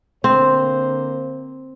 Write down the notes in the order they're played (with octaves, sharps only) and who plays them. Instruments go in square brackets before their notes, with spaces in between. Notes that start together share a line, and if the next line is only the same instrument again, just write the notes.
[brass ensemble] D3 A#3 C5 [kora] C4